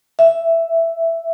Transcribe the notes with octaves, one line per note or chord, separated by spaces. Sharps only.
E5